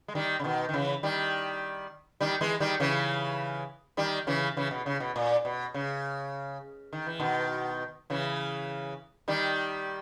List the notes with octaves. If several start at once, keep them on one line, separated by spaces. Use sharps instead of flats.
G#3
D#3 G3
C#3
B2 D#3
D#3
C#3 E3
D#3 G3
D#3 G3
E3 G#3
D#3 G3
C#3 E3
D#3 G3
C#3 E3
C#3 E3
B2
C#3
B2
A#2
B2
C#3
D#3
E3
B2 D#3
C#3 E3
D#3 G3